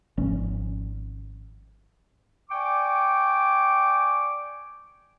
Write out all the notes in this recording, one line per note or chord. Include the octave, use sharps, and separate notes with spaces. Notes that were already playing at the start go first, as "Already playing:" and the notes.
G#1 F3 C#4
D5 G5 G#5 C#6 D6